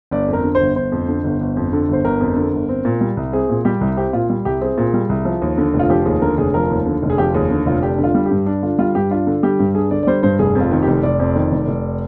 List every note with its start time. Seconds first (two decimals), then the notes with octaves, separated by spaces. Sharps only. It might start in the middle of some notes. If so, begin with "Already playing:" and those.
0.11 G1 D5
0.28 F2 A#4
0.44 D3
0.55 C5
0.60 G1
0.76 G1 C5
0.92 F2
1.09 D3
1.24 G1
1.41 G1
1.57 F2
1.73 D3
1.89 G1 C5
2.05 G1 A#4
2.20 F2
2.36 D3
2.53 G1
2.69 C4
2.85 A#2
3.01 G3
3.17 C2
3.33 C4 G#4
3.49 A#2
3.65 G3 G4
3.81 C2
3.97 C4 G4
4.13 A#2 F4
4.30 G3
4.45 C2 G4
4.61 C4 G#4
4.78 A#2
4.94 G3
5.09 C2
5.25 F3
5.42 D#2
5.58 D3
5.74 F1
5.79 F4
5.90 F3 G4
6.06 D#2 G#4
6.22 D3 A#4
6.38 F1 G#4
6.54 F3 A#4
6.70 D#2
6.86 D3
7.03 F1
7.10 G#4
7.18 F3 G4
7.34 D#2 G#4
7.50 D3
7.66 F1 F4
7.82 D4 G4
7.99 D3 F4
8.15 G3
8.26 G2 G4
8.46 D4
8.63 D3 F4
8.78 G3 F4
8.95 G2 G4
9.11 D4 F4
9.27 D3
9.43 G3 G4
9.59 G2
9.75 D4 G#4
9.91 D3 D5
10.03 D5
10.07 G3 C5
10.23 G2 C5
10.39 F1 G#4
10.55 F2
10.61 F4
10.71 D#3
10.82 G4
10.87 F1
11.03 F1 D5
11.19 F2
11.36 D#3
11.52 F1
11.68 F1